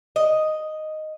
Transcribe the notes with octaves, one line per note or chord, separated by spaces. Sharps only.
D#5